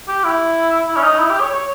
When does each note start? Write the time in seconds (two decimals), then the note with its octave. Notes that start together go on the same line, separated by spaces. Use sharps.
0.08 G4
0.24 E4
0.88 E4
0.97 C#4
1.04 D#4
1.19 E4
1.30 G4
1.41 C#5
1.51 C#5